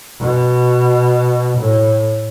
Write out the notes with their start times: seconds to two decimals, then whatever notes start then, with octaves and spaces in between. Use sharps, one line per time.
0.21 B2
1.57 A2